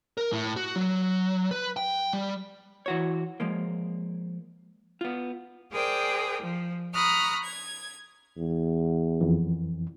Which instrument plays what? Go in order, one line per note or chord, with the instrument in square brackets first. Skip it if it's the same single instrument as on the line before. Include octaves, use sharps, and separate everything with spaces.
[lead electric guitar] A#4
A2
F#4
F#3
B4
G5
G3
[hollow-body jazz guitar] E3 F#4 C#5
F3 G#3 A#3
B3 F4
[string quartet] G#4 A#4 C5 D5 G5
F3
A#5 B5 C#6 D#6 F6 F#6
G#6
[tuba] E2
[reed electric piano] F2 E3